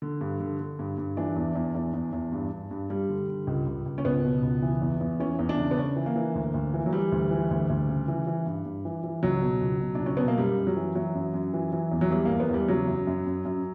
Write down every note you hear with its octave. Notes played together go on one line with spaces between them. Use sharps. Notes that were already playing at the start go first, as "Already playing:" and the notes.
D3
G2
D3
D3
G2
G2
E3 D4
E2
E2
E2
E2
E2
G2
G2
G2
G2 G3
D3
D3
C#2
C#2
C#2
C#4
C#2 B3
B2
C#2
E3
E2
E2
E3 C#4
E2
D4
C#3
B3
C#3 C#4
E3
A#3
E3
D2
D2
E3
F#3
E3 G3
D2
E3
D2
D2
C#3
E3
E3
G2
G2
E3
E3
C#2 F#3
B2
C#2
B2
C#2 D4
C#4
B2 B3
A#3
F#2 G3
F#2
F#3
E3
E3 F#3
F#2
F#2
E3
E3
E2
F#3
E2 G3
E2 A#3
B3
E2 G3
C#3 F#3
F#2
F#2
F#2
F#2